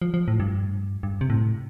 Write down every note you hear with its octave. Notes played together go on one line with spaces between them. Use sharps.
F3
F3
A2
G2
G2
C3
A2